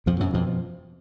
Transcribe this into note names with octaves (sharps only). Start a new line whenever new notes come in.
F2 B2 F3
F#2 F#3
F2 B2 F3
F3